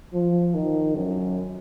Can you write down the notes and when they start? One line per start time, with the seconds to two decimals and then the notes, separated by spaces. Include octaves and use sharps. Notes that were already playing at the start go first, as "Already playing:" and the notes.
0.13 F3
0.54 D#3
0.96 F#2